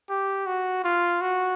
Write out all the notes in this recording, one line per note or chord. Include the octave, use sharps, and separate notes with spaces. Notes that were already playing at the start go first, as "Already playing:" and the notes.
G4
F#4
F4
F#4